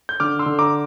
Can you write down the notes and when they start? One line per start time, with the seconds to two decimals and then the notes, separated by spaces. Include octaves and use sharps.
0.09 G6
0.20 D3 D6 F6
0.39 C6 E6
0.46 D3
0.59 A#5 D6